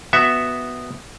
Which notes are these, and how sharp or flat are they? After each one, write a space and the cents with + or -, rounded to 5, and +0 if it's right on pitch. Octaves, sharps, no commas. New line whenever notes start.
B3 +0 F#4 +0 E5 +0